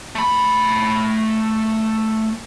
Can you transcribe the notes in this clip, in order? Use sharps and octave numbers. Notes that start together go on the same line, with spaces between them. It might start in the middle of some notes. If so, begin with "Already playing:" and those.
A3 B5